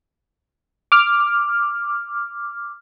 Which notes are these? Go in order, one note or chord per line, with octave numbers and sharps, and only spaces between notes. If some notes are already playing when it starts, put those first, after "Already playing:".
D6 F6